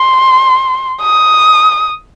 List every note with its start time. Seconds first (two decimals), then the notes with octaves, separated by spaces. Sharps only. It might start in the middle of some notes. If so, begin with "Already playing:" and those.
Already playing: C6
1.02 D#6